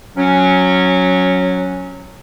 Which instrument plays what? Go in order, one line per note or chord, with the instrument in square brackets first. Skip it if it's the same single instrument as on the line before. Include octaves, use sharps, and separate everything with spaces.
[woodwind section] F#3 C#4